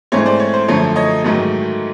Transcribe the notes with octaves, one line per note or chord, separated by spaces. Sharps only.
G#2 E3 A3 C4 C#5
C5 D5
C#5
C5
F#2 D3 F3 A3 C#5
C#5 D#5
G#2 D#3 F#3 A3